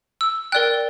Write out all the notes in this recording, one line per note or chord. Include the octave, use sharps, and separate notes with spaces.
E6
A#4 D5 G5 F#6